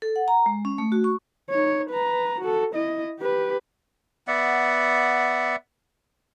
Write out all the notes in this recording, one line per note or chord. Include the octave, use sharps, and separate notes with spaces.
A4
F#5
A#5
G#3
C#4
A3
F#4
C#6
D#4 C#5
B4 A#5
F#4 A4
E4 D#5
G4 B4
B3 D5 E5 F#5